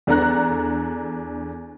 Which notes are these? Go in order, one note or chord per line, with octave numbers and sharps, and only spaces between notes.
E2 D4 A4 A#5 F#6